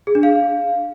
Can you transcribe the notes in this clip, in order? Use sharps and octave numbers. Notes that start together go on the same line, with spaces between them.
G#4
D4
F5